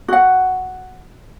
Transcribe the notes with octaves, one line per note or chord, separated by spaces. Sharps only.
F#4 F#5